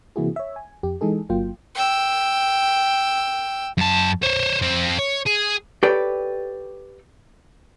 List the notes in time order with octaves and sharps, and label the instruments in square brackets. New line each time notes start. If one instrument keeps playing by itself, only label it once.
[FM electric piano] C3 E3 A#3 E4 F#4 G#4
C#5 E5
G#5
F2 G4
E3 G#3 D#4 G#4 A4
G1 F#3 A#3 F4 G5
[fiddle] G5 E6
[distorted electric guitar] F#2 A5
C5 C#5
F2 C4
C#5
G#4
[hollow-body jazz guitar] G4 A4 B4 C#5 D5 G5